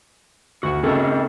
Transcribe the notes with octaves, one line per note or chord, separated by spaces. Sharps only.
D2 F#4
C#3 A3 C4 D#4 A4 A#4